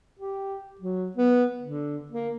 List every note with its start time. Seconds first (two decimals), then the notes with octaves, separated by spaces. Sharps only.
0.19 G4
0.80 F#3
1.17 B3
1.62 D3
2.12 A#3